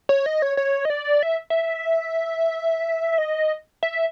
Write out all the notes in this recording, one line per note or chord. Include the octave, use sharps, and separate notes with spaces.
C#5
D#5
C#5
C#5
D#5
D5
E5
E5
D#5
E5